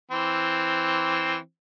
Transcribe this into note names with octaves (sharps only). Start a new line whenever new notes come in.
E3 C4